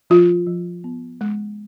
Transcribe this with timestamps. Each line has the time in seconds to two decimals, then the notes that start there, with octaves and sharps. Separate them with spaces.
0.10 F3 F4
0.47 F3
0.84 B3
1.21 G#3